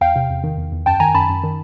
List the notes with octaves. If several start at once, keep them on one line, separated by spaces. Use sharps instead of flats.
E2 F5 G5
C3
E2
D#3
E2
E2
F#2 G5 A5
D#3 G#5 A#5
F#2 A5 B5
F#2
D#3